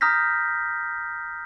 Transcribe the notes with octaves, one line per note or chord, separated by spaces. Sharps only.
A#5 D#6 F6 G6 A#6 B6